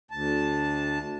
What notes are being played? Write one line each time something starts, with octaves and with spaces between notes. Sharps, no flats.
D2 A5